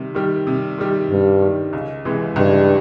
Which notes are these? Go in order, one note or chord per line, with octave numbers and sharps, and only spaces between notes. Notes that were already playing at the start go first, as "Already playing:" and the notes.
Already playing: C3 D#3 G3
D#3 G3
C3
D#3 G3
G2 C3
D#3 G3
C#2
C3 E3 G#3
C#2 G2